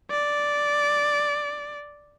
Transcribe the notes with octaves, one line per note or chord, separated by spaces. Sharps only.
D5